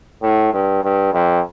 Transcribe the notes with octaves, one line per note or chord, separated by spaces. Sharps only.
A2
G2
G2
F2